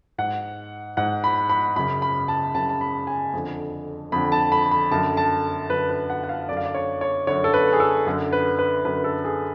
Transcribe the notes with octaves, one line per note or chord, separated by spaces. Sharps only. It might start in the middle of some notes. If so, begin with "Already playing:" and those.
G#2 F#5
G#2 F#5
B5
B5
F#2 C#3 B5
B5
A5
F#2 C#3 A5
A5
B5
G#5
F2 D3
F2 D3 B5
A5
B5
B5
F#2 D3 A5
A5
F#2 D3 B4
B4
F#5
F#5
F5
F#2 D3 D5
F5
D5
C#5
C#5
F#2 D3 C#5
A4
B4
G#4
A4
F#2 D3
B4
B4
F#2 D3 B4
A4
G#4